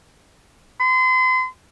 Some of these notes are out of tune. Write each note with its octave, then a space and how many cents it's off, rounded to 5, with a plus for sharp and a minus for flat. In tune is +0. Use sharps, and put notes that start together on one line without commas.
C6 -35